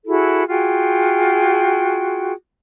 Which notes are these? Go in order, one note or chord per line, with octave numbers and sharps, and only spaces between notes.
E4 F#4 G#4 A4
F4 F#4 G#4 G5